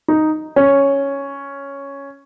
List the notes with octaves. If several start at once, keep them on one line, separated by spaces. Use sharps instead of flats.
D#4
C#4